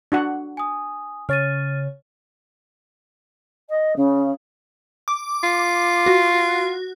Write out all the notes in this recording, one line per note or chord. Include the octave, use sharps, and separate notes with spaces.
D4 F#4 F#5
G#5 D#6
C#3 C#5 F6 A6 D#7
D#5
C#3
D6
F4
F#4